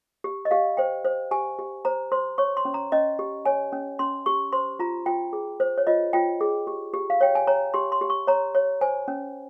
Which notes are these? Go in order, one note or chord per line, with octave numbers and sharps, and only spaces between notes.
G4
D#5
G4 F5
C5 G5
C5
G4 G#5
G4
C5 A#5
C5 C6
C#5 C#6
C6
C#4
A#5
C#4 D#5
G4
C#5 G#5
C#4
C#4 C6
G4 C#6
C5 C6
F4 A#5
F4 G5
G#4
C5
C#5
F4 D#5
F4 G5
G#4
G4
G4
F5
C#5 G5
G#5
C#5 A#5
G4 C6
C6
G4
C#6
C#5 A#5
C#5
C5 G#5
C#4